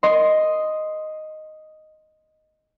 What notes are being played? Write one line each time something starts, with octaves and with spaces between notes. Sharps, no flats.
D#5 C6